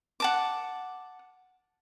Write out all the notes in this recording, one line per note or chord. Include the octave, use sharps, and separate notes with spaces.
F#5 A5 D6